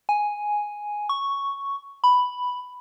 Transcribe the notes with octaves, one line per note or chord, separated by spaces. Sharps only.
G#5
C#6
B5